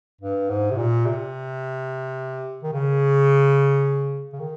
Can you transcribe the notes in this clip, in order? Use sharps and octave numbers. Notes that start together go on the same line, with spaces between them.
G2
G#2
C3
A#2
C3
D#3
C#3
C#3
D#3